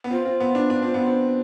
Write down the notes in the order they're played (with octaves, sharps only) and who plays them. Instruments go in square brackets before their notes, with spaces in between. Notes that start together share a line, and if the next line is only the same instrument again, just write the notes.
[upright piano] B3
[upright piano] C4 [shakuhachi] F4
[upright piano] C4
B3
D4
D4
C4
B3
C4